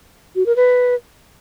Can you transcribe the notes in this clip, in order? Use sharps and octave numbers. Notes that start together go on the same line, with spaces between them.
F#4
A#4
B4